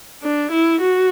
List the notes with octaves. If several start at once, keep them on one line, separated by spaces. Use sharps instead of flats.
D4
E4
F#4